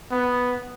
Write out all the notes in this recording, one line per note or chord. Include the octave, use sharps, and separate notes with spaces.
B3